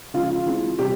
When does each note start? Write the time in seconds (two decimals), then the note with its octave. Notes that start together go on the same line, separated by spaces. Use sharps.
0.14 C#3 F3 G#3 F4
0.30 F4
0.46 E3 G#3 C4
0.79 C3 G3 G4